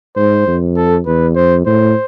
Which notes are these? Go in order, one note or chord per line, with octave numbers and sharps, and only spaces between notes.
G#2 C5
F2
A4
E2 B4
F2 C5
A2 C5